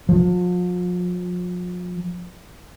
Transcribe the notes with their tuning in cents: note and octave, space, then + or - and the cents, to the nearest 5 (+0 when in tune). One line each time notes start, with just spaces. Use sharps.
F3 +40